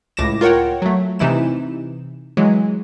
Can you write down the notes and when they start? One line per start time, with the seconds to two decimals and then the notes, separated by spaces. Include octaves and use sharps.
0.17 C#2 A2 D6 A#6 E7
0.41 F4 A#4 C#5 F#5 G5
0.82 F#3 A3
1.19 C3 E3 D#4 E4 E7
2.37 E3 F#3 G#3